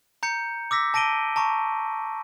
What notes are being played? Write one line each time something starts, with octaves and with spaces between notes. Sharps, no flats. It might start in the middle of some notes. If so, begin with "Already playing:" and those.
A#5 G6 C#7
D6 E6 A#6 B6
A5 A#6 D7 D#7 G7
A5 A#5 C#6